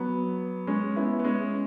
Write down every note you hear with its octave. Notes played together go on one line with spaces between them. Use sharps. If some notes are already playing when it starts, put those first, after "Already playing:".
Already playing: F#3 B3
G#3 C#4
B3 E4
B3
G#3 C#4